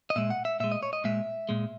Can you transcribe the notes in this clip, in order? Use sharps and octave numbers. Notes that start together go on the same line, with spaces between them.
D#5
A#2 G#3 E5
F#5
E5
A#2 G#3 E5
D#5
C#5
D#5
A#2 G#3 E5
A#2 G#3